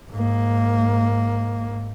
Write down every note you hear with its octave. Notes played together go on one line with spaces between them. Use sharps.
G#2 A#3